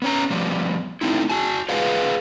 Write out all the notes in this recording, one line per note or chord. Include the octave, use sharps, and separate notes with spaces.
B3 C#4 A#5
F3 G3 B3
A3 C4 D#4 E4
F#4 G#5 A5
F4 G#4 B4 F5 F#5